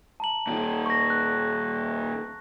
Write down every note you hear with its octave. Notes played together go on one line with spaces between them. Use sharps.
A5 A#5 F#7
A#2 D#3
C#6 A#6
F#6